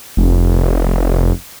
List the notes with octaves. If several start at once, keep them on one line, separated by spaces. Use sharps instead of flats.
F1